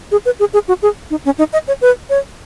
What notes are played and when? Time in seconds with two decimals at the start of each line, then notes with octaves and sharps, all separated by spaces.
0.12 G#4
0.25 B4
0.40 G#4
0.54 G#4
0.68 F#4
0.82 G#4
1.11 D#4
1.25 C#4
1.38 D#4
1.53 D#5
1.68 C#5
1.81 B4
2.10 C#5